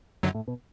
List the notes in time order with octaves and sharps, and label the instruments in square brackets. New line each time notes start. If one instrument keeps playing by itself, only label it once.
[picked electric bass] F#2 [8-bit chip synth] D3 F#3
[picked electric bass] A2
B2